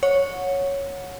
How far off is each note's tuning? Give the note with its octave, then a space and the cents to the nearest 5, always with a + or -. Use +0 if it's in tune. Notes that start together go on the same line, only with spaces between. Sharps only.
C#5 +0 F#5 -25